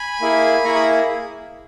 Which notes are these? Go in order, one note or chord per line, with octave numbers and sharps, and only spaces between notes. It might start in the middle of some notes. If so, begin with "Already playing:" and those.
Already playing: G#5 B5
A#3 E4 G#4
A#3 E4 G#4 A#5 C#6
B5 D#6